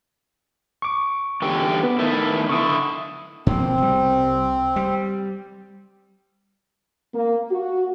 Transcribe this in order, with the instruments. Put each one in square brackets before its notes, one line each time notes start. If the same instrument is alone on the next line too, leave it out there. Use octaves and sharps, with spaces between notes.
[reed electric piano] C#6 D6
[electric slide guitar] E2 D3 G4
[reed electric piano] B3
[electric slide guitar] D#3 A3 E4
[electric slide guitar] D3 E4 [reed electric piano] C#6 D#6
[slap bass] B2 F3 A#3 [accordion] C4
[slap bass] C2 G3
G3
[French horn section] A#3
F#4